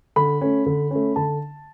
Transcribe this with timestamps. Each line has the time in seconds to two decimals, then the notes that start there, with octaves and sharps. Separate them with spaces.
0.16 D3 B5
0.41 A3 C#4
0.66 D3
0.91 A3 C#4
1.16 D3 A5